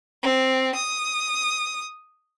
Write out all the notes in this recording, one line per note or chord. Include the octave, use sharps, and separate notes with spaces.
C4
D#6